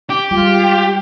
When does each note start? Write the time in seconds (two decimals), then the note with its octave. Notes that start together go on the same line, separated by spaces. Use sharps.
0.10 G4 D6
0.31 G3 G#3 F4 G5